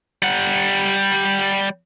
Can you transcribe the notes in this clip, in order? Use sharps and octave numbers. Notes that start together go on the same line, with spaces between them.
G3 F#5